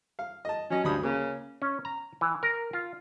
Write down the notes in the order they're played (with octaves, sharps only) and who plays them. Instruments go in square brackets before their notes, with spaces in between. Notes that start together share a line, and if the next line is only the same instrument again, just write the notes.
[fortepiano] F5
D#5 A5
[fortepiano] F#3 D#5 [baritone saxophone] C#4
[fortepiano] D2 B5 D#6 [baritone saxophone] G2
[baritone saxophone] C#3 [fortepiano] A#3
[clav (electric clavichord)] C#4
A#5
E3
A#4
F4